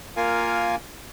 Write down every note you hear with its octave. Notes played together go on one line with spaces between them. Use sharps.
A#3 F4 A#4 F5 G#5